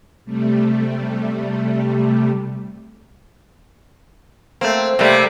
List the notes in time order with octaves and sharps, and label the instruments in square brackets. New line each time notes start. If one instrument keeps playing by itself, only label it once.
[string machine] C3 G3 A3
[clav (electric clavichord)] A3 A#3 [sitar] C4
[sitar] C3 G3 [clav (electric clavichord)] A3 A#3 C4